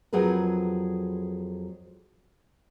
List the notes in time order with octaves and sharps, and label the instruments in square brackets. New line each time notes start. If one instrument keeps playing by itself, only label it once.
[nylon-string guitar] F2 F#3 G#4 A#4 B4